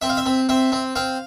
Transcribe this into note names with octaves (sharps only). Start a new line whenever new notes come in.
C4 E5
F5
E5
C4
C4 E5
C4
C4 F5